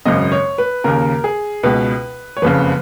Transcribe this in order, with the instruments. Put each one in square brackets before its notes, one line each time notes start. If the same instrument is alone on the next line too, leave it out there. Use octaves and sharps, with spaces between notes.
[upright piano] G#1 F#2 C#3 D#5
C#5
B4
D#2 C#3 A#4
G#4
C#2 B2 B4
C#5
F#1 F2 C#3 B4